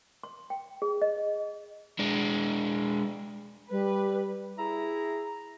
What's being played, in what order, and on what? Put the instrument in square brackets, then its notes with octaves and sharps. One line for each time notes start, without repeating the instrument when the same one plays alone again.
[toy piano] C6
G5
G#4
D#5
[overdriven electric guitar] G#3 D4
[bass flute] G3 [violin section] B4
[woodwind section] E4 G#4 E5 A#5